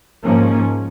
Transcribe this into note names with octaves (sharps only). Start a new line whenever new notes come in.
G#2 F3 A#3 C#4